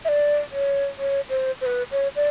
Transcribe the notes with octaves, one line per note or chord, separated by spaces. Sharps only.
E5
D5
C#5
C#5
C5
C5
B4
C#5
D5